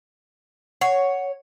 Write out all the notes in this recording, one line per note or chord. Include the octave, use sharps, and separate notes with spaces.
C#5 F#5